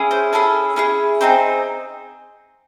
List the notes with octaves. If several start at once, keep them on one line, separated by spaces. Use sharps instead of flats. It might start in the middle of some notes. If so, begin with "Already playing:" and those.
Already playing: C#4 E4 G#4
C5
C#4 E4 G#4 A4
C#4 E4 G#4
C4 D#4 G#4 C5